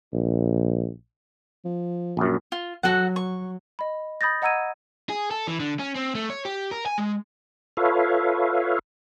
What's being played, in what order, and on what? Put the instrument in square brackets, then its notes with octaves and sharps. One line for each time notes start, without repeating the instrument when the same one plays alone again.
[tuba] A#1
[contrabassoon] F3
[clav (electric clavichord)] A#1 F#2
[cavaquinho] F4
[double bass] F#3 [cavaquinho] F#4 A4 F#5
[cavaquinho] C#6
[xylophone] D#5 B5
B5 D#6 G6 A6 A#6
D#5 F#5 A#5 E6 G#6 D#7
[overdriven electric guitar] G#4
A4
E3
D3
C#4
C4
A3
C#5
G4
A#4
G#5
G#3
[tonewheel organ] F4 A4 B4 C#5 E5 F5